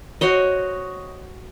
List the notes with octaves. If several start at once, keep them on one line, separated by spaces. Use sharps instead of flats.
F#4 C5 C#5 D#5